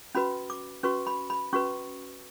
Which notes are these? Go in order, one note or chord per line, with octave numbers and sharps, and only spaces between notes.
C#4 F#4 B4 B5
D6
C#4 F#4 B4 C#6
B5
B5
C#4 F#4 B4 C#6